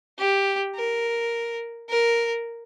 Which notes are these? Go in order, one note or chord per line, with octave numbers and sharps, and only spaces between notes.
G4
A#4
A#4